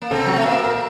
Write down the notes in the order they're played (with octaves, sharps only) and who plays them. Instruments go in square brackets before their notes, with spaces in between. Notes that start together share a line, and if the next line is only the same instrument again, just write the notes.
[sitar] A#3
[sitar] C3 C4 [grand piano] A4
[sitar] F#3 [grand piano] F#4
[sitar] A3
A#2 A#3
[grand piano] A#4